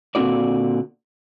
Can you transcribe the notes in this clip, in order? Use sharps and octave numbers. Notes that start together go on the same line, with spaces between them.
A#2 D3 C4 F4 F#4 D5